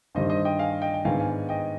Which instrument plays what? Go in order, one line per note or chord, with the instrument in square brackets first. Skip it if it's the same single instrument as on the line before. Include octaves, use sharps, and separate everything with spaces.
[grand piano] G2 D#3 G3 C5 D#5
C5 D#5
D#5 G5
F5 G#5
D#5 G5
G5
G#2 D#3 G#3 B3 D4 F5 G#5
F5 G#5
D#5 G5